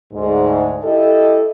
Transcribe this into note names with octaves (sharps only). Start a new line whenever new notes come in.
D2 G#2
E4 G4 A4 D#5